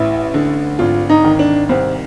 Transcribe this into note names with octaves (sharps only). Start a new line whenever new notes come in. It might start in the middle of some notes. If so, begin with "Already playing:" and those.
Already playing: A1 E4
D3
G#1 F4
D#4
D#3
D4
C2 C4